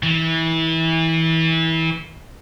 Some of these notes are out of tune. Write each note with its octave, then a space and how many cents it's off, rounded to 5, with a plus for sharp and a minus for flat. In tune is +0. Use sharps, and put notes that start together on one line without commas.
E3 -25